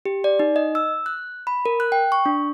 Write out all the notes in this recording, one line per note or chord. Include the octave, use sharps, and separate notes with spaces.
G4
D5
D#4
D#5
E6
F#6
B5
A#4
F#6
G5
C#6
D4